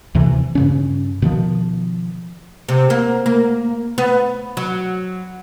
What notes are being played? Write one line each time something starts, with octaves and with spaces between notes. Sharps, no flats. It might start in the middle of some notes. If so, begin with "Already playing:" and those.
D2 C3 E3
G2 C#3 C#4
B2 D#3 F3
C3
A#3
A#3
B3
F#3